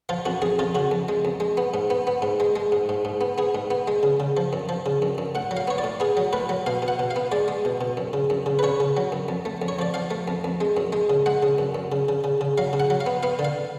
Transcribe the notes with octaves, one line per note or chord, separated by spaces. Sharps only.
F3 F4
F2 F#4
F2 G#4
F2 F4
C#3 F#4
F2
G#3
F2
G#3
B3
G#2
B3
B3
G#2
G#3
G#3
G#2
G#2
G#2
B3
B3 G#4
G#2
B3
G#3
C#3
C#3
F3
F#2
F3
C#3
F#2
F#2
A2 F#5
F#3
F5
B3 C#5
D5
A2
B3 G#4
F#3
A2 B4
F#3
B2 F5
B2
F#5
B2
F5
B3
G#3 D5
G#3
B2
B2
F#2
C#3
F#2
C#3
B4
C#3 C#5
C#3
F#3
F#2
F2
A3
F2
C#5
F3 D5
F3 F5
A3
F2
F2
G#3
F#2
G#3
C#3
G#3 F#5
C#3
F#2
F#2
C#3
C#3
C#3
C#3
F#3 F5
C#3
F#5
F#3
F5
B3
B3 F5
D3
F5